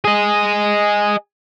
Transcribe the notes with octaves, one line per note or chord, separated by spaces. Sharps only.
G#4 D#5